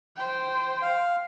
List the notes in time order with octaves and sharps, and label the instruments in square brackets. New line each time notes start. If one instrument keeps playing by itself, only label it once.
[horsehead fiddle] C5 G5
[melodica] F5